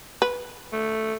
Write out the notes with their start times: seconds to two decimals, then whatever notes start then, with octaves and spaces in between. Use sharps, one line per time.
0.22 B4
0.73 A3